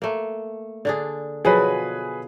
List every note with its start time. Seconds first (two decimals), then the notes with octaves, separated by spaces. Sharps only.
0.02 A3 A#3
0.85 D3 D4 G#4
1.45 B2 F3 F#3 G#4 B4